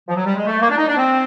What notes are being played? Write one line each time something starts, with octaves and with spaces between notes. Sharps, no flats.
F3
F#3
G3
G#3
A3
A#3
D4
D#4
D4
C4